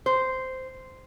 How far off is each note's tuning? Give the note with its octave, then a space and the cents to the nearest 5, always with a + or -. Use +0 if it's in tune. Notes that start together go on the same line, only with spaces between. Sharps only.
C5 -10